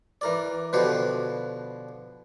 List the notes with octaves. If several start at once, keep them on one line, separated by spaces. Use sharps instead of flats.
E3 A#4 D5
B2 D3 F3 G4 B4